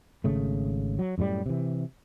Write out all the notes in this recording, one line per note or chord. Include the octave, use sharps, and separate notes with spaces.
G#1 C#3 A3
F#3
F#2 A2 F#3 G3
C3 E3